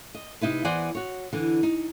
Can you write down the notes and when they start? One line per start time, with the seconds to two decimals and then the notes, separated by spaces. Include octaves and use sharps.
0.15 D#5
0.41 C3 D#4 E4 B4
0.65 E2 E3 C5 D5 F#5 G#5
0.95 F#4 C#5
1.33 D3 E3
1.63 D#4